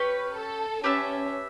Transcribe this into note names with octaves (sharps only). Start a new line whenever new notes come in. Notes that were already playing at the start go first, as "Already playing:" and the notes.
Already playing: C#4 G4 B4 C#5
A4
C#4 G4 B4 E5 A5